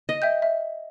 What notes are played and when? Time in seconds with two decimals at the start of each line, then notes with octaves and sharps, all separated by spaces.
0.09 D#5
0.22 E5 G5 G6
0.42 E5